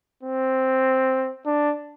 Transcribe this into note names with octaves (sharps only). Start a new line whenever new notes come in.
C4
D4